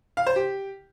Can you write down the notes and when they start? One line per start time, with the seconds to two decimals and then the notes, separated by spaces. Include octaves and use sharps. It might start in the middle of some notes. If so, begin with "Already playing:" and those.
0.17 F5
0.27 C5
0.36 G4